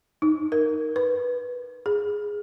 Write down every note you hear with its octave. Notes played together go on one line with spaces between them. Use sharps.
D#4
A#4
B4
G#4